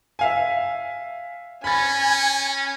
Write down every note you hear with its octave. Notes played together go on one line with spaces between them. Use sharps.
E5 F5 G#5
C#4 G#5 B5 G#6 A6